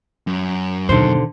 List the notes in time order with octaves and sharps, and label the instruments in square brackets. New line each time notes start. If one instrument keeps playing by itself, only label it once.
[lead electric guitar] F#2
[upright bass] D#2 B2 [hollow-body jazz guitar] D3 C5